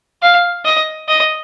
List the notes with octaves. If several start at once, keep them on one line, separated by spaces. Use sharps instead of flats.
F5
D#5
D#5